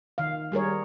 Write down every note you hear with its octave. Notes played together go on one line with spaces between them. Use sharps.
D#3 F5
G3 G#4 A#4 C#5